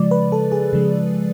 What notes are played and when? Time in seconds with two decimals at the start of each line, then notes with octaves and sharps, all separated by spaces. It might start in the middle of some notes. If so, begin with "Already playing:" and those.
Already playing: C#3 F3 G#3 D5
0.11 B4
0.32 A4
0.52 G#4
0.73 C#3 F3 G#3